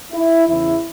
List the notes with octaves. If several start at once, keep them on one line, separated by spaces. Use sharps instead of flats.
E4
E2 C#3 E3 E4